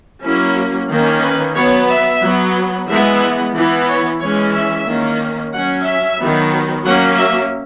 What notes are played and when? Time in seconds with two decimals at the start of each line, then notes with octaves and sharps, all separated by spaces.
0.23 F#3 A#3 C#4 E4
0.89 D#3 A#3 C#4
1.22 B4
1.55 F#3 B3 C#5
1.89 E5
2.21 F#3 B3
2.88 E3 G#3 B3 E5
3.54 E3 B3
3.87 C#5
4.20 E3 G#3 C#4 C#5
4.53 E5
4.86 D#3 A#3 C#4
5.52 F#3 C#4 F#5
5.85 E5
6.19 D#3 F#3 B3
6.85 F#3 A#3 C#4 F#5
7.18 E5